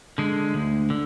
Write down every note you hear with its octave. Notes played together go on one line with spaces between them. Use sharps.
D3 G#3
D2
D3